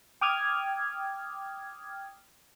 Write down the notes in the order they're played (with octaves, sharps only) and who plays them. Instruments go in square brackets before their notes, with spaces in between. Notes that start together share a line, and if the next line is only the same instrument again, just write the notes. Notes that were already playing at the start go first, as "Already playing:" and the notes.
[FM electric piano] G5 D6 D#6 F6 G#6